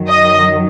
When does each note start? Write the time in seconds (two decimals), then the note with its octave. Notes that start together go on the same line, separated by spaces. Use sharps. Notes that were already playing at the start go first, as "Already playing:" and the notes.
Already playing: F#2 D#3 F#3
0.08 D#5